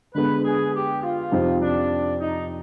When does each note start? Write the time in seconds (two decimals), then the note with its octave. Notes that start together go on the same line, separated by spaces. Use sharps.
0.14 D3 G#3 B3 D4 B4
0.44 G#4
0.73 G4
1.03 F4
1.32 F2 C3 F3 C4 D#4
1.61 D4
2.20 D#4